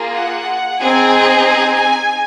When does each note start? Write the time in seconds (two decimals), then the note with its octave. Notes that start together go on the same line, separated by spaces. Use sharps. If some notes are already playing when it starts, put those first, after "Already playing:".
Already playing: A#3 F4 G#4
0.14 F#5
0.80 C4 D#4 G#4 G#5
1.47 G#5
1.81 G#5